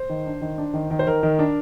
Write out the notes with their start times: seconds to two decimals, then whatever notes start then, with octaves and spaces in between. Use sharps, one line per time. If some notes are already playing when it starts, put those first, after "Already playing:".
Already playing: C5
0.10 D#3
0.26 D4
0.41 D#3
0.58 D4
0.74 D#3
0.91 D#3
0.99 C5
1.07 D#3 A#4
1.23 D#3
1.39 D4